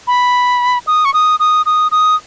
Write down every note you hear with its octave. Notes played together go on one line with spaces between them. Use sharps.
B5
D#6
C#6
D#6
D#6
D#6
D#6